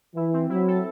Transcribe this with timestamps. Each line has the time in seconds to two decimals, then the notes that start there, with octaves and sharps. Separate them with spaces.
0.15 E3 E4
0.33 C4
0.50 F#3 E4
0.67 A4